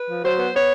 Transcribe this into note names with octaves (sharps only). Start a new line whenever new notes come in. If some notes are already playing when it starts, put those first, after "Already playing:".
Already playing: B4
F3
F#3 C5
B3
B3 C#5